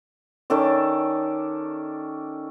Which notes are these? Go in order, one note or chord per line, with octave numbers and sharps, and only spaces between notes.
D#3 C#4 A4 D5